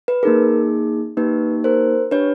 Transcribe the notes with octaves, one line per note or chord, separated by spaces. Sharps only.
B4
A#3 D#4 G#4 A#4
A#3 D#4 G4 B4
A#4 C5
D4 G4 B4 C#5